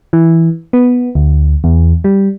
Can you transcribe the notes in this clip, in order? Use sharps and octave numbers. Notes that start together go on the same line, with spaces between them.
E3
B3
D2
E2
G3